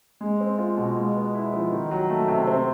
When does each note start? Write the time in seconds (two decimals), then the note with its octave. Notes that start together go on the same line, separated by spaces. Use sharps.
0.21 G#3
0.40 C4
0.58 F4
0.77 B2
0.96 G#3
1.15 B3
1.35 E4
1.53 F3
1.72 D#3
1.91 F#3
2.10 A3
2.28 C3
2.47 C4